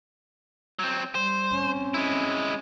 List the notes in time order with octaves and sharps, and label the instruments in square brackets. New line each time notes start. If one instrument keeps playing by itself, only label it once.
[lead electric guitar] F#3 C4
[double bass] G3 [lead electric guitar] C5
[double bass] C4 C#4
[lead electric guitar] G#3 E4